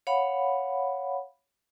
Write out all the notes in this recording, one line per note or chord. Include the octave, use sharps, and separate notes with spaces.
C#5 F5 F#5 B5